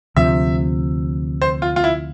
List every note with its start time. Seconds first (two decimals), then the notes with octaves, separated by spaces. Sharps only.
0.16 D2 C3 F3 E5
1.42 C5
1.62 F4
1.76 F4
1.84 E4